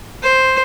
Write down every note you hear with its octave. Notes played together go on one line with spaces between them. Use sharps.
C5